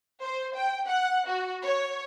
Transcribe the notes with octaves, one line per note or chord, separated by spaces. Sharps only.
C5
G5
F#5
F#4
C#5